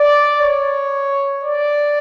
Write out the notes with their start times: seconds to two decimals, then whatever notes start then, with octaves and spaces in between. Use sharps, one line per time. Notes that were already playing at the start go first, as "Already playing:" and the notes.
Already playing: D5
0.40 C#5
1.44 D5